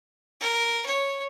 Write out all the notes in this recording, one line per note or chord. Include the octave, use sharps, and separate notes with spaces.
A#4
C#5